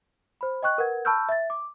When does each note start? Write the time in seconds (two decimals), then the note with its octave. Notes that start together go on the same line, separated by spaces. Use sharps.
0.41 C5 B5
0.63 D#5 G5 C#6 F#6
0.78 A#4 B4 F#5 G#6
1.05 A5 B5 C#6 E6 F6 G6
1.29 E5 A6
1.50 D6